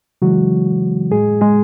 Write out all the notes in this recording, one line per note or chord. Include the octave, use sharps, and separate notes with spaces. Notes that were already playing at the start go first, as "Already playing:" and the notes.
C#3 E3 F#3 G#3 F#4
A2 G#3 G#4
G#3 G#4